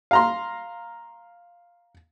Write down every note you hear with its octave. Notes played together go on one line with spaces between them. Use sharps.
F5 A#5 C6